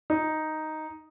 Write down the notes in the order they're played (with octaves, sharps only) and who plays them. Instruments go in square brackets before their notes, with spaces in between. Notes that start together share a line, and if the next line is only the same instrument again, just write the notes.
[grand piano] D#4